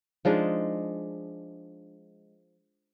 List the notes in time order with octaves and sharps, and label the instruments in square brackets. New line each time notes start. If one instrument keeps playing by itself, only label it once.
[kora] F3 G#3 D4 D#4